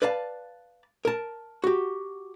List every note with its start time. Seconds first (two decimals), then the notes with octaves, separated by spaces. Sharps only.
0.02 B4 D5 F5 A5
1.05 A#4 A5
1.64 F#4 G4